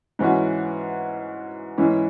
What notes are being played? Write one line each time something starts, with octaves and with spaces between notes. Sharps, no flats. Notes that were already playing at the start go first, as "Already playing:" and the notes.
G#2 E3 C#4 F#4
G#2 E3 C#4 E4